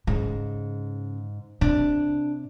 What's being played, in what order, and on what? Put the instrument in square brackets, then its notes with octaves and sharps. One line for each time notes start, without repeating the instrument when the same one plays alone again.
[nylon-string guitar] G#2 [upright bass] C#3
[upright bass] C3 [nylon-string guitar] D4